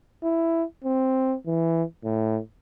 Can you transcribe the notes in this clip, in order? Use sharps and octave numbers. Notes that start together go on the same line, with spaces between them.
E4
C4
E3
A2